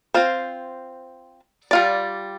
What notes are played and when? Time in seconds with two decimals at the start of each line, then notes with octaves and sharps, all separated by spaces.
0.14 C4 F4 C5
1.71 G3 F4 D5